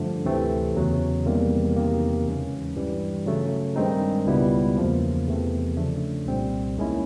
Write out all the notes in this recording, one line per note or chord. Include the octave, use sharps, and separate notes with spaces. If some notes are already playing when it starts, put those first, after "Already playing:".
Already playing: G2 D3 F3 A3
D2 C3 E3 A3 C4
E2 C#3 F#3
E2 C3 D#3 G3 A#3
E2 C3 D#3 F#3 A#3
D#2 C#3 E3 G#3 C#4
G2 E3 G3
C#3 F#3 A3
G2 D#3 G#3 C4 D#4
C#2 B2 G3 B3 E4
E2 C#3 F3 A#3
E2 C3 E3 A3 C4
C#3 F3 A3 D4
C2 A#2 G3 C4
D#2 D#3 G#3 C#4 E4